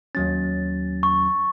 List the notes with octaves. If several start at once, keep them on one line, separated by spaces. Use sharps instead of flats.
D#2 F#3 C#4 A6
C#6